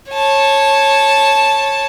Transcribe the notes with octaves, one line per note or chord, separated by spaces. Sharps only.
C#5 A5